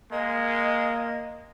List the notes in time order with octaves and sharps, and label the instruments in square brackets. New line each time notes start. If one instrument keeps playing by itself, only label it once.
[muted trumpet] G#3 [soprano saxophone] A#3 [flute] D#5